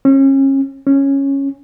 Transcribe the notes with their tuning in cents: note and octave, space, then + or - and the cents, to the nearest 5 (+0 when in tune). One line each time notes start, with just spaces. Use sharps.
C#4 -35
C#4 -10